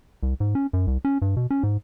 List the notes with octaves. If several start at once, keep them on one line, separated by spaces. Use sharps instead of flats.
C2
G#2
C#4
F#2
C2
C#4
G2
B2
C#4
G#2